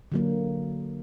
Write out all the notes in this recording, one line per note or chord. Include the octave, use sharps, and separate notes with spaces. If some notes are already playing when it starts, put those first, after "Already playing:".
D3 F#3 A#3